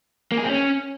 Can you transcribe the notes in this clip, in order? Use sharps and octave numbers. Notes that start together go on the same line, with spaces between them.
A#3
G#4
C4
C#4